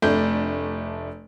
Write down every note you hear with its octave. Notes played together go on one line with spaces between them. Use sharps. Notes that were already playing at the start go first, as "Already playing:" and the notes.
F1 A3 D4 G6